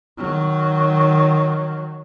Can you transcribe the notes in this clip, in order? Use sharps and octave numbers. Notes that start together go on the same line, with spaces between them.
D#3 F#3